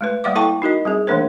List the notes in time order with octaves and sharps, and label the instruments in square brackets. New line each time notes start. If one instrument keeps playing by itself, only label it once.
[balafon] G#3 A3 B4
G3 A#3 D5 E5 F5 D6
E4 A4 G5 A5 C#6 D6
D#4 F#4 A#4 D#5
G3 C4 G#4
E3 A3 A#3 D4 A#4 C5